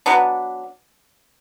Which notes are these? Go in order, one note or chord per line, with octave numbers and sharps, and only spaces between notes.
F#3 B3 D4